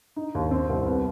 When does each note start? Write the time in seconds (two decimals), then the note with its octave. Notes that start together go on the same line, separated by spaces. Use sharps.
0.16 D#4
0.35 D#2
0.51 C4
0.69 C2
0.86 B3